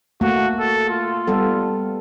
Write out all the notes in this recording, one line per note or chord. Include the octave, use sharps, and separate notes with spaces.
A3 A#3 F#4
A4
F4
G3 B3 A4